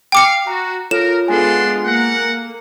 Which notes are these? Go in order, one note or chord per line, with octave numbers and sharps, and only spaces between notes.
F5 G5 D6 C#7
F#4 A#5
F4 A4 A#4 C#5 E7
G#3 B3 D4 F4 A4 F#5 G#5 C6
A#3 A#4 F#5